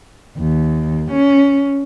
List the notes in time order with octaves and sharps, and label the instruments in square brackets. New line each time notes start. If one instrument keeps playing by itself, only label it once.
[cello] D#2
C#4